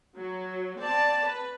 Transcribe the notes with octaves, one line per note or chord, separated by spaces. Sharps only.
F#3
C4 D5 A5
B4